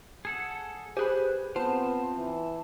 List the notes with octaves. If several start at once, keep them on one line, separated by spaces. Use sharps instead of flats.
G#4 A4 F#5
G4 G#4 B4 C5 G#5 F#6
B3 C4 F4 C5 A5
E3